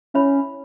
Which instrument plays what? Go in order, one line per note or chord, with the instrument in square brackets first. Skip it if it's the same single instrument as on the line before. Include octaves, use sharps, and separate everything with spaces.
[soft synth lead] C#4 [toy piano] E4 C#5 E5 B5